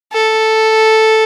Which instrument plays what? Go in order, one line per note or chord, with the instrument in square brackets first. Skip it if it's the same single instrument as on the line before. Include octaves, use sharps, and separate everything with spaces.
[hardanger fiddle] A4